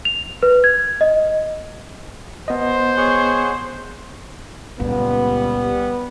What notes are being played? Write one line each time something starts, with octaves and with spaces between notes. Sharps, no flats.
F7
B4
G#6
D#5
B3 C5 D#5
G#4 C#5 F#5
C#2 A#2 G3 B3